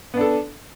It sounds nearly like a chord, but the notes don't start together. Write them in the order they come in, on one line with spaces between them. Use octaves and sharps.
B3 D4 A4